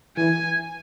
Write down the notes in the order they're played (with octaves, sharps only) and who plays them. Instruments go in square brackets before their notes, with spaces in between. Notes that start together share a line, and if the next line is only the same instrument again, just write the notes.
[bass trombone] E3 [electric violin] G#5